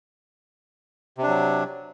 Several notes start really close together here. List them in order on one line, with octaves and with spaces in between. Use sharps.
C3 D4 F#3